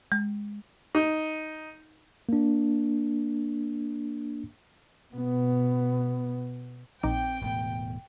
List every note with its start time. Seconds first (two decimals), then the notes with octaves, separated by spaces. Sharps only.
0.12 G#3
0.95 D#4
2.29 A#3 D4
5.14 B2 B3
7.03 A#1 C4 D#4 G5 D6
7.41 E1 A2 B3